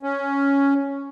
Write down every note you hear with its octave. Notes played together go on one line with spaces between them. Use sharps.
C#4